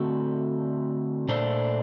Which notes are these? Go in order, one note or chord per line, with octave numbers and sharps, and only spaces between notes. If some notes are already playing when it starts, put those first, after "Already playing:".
Already playing: D3 A3 C4 F#4 A4
A#2 A3 D4 A4 C5